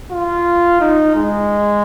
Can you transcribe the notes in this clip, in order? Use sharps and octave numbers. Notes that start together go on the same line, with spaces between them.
F4
D#4
G#3